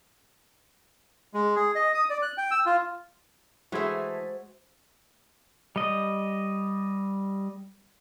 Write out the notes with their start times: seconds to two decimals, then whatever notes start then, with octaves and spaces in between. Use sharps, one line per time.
1.34 G#3
1.56 G#4
1.75 D#5
1.94 D#6
2.10 D5
2.22 F#6
2.38 G5
2.51 E6
2.66 F4
3.72 E3 G#3 A3 F#4 G#4 C5 E5 G#6
5.76 G3 D#5